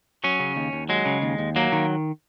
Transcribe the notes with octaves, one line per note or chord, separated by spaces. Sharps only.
F#3 C#4
C#3
D#2
D#2
F#3 G#3
C#3
D#2
D#2
F#3 A#3
D#3